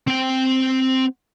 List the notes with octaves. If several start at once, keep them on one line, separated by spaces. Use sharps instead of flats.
C4 G5